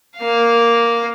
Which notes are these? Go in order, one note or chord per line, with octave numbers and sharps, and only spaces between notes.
A#3 F5